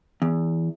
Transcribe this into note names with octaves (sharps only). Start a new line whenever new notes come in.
E2